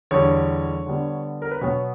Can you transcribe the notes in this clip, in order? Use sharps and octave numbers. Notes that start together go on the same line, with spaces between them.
E2 D3 G3 C#5
D3 G3 B3
A#4
B4
B2 F#3 B3 C#5